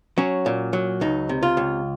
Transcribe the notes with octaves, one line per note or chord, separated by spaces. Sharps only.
F#3 C#4
A#2
F#3
C#2 D#4
C3
F4
C#2